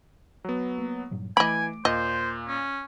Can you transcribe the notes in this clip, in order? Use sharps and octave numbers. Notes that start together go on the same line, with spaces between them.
F#3 B3
A#3
G2 A#2 F#3
E3 A3 D#5 G#5 B5 D6 D7
D#2 A#2 C5 D#5
C#4